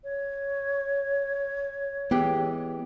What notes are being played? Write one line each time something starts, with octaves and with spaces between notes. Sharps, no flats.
C#5
E3 G#3 B3 G4